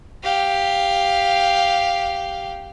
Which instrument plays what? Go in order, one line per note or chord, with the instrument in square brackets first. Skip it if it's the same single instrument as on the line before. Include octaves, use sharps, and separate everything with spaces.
[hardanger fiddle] G4 F5